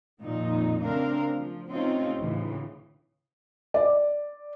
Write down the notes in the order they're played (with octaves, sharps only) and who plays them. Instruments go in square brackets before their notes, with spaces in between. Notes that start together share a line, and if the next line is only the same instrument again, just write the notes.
[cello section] F2 A#2 D#3 D#4
C#3 A3 C4 D4 A#4 F5
F3
C3 A3 C4 C#4 D#4 F4
D2 A2 C#3 E3
[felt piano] D5